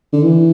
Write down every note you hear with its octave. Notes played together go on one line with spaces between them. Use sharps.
D3
E3